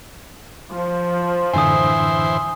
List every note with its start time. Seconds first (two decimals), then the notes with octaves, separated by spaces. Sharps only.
0.72 F3
1.53 F#2 A2 D3 E3 C5 G#5 D#6